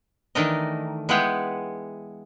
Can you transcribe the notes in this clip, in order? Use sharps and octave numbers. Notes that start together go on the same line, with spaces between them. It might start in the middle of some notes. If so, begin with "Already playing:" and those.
D#3 E3 A3 D4 A#4 D#5
G#3 B3 E4 G#4 F#5 G5